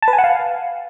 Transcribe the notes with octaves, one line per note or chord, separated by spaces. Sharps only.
A5
B4
G#5
F#5
F5